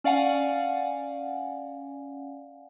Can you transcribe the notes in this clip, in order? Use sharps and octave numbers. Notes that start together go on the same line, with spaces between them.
C#4 D5 F5 F#5 G#5